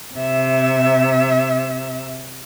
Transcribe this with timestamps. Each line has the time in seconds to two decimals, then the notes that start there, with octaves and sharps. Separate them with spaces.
0.15 C3 E5